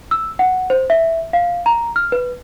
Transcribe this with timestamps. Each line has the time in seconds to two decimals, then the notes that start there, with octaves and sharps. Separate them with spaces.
0.11 E6
0.39 F#5
0.70 C5
0.90 E5
1.33 F5
1.66 A#5
1.96 F6
2.12 B4